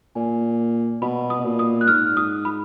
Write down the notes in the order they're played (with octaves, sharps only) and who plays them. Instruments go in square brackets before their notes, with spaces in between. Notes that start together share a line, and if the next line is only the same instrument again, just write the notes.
[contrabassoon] A#2 [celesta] G#5
[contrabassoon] B2 [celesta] B5
[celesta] D#6
[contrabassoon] B2
A#2
[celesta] D#6
F#6
[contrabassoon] G#2 [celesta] F6
[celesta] D#6
B5